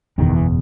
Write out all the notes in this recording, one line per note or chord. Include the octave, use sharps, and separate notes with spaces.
F#1 E2 B2 D#3
E3